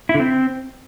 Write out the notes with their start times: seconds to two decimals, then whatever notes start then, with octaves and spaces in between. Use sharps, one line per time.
0.09 E4
0.14 D3
0.20 C4